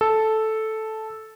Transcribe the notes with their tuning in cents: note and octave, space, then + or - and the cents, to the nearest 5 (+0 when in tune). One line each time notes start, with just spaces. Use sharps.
A4 -5